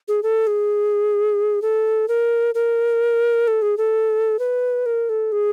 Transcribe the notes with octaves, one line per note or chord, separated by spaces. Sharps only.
G#4
A4
G#4
A4
A#4
A#4
A4
G#4
A4
B4
A#4
A4
G#4